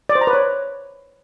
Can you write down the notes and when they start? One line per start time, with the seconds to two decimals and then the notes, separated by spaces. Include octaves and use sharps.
0.09 D5
0.15 C5
0.21 A#5
0.27 B4
0.33 C#5